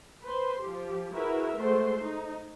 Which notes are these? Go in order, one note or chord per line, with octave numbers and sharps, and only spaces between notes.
B4 C5 C6
F3 G4
E4 F#4 G#4 A#4 B4 E5
G#3 A3 F#4 C5 C6
D#4